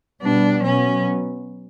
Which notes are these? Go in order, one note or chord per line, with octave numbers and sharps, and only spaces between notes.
B2 G3 B3 D4
B2 F#3 B3 C#4